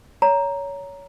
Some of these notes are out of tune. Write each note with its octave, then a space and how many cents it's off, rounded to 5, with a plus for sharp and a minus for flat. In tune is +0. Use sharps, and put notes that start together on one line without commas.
C#5 +20 A#5 +0